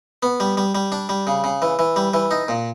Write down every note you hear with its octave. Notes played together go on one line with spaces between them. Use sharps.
B3
G3
G3
G3
D4
G3
C#3
C#3
E3
E3
G3
E3
D#4
A#2